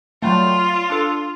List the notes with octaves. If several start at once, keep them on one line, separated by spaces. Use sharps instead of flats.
F#3 G3 A3 F4
D4 A4